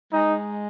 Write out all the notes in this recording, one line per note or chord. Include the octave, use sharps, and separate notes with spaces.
G#3 D#4